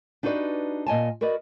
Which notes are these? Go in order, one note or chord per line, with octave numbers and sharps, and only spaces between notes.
D4 D#4 F#4 G4 B4 D5
A#2 D#5 G#5 A5
F#4 A#4 B4 D5 D#5